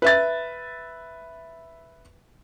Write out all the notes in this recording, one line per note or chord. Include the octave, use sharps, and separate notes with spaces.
B4 E5 A6